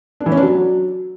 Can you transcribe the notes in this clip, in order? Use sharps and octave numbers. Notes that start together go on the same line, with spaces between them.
D4
E3
C#4
D4
F#3